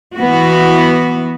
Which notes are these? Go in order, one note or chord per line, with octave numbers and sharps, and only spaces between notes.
E3 B3 F#4